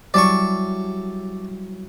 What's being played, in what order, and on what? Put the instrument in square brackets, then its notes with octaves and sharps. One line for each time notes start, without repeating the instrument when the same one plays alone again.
[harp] F#3 G3 E4 [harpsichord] D5 A5 C#6